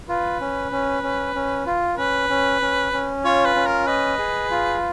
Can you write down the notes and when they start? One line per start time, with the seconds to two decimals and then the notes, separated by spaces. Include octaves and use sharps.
0.09 F4 B4
0.40 C#4
0.72 C#4
1.03 C#4
1.35 C#4
1.66 F4
1.97 C#4 B4
2.29 C#4
2.61 C#4
2.93 C#4
3.24 F4 C#5
3.45 B4
3.55 C#4
3.66 A#4
3.87 B4 D#5
4.19 G#4
4.51 F4